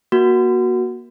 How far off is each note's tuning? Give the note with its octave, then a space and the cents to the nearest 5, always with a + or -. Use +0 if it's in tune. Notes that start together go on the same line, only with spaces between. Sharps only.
A#3 +30 F#4 +0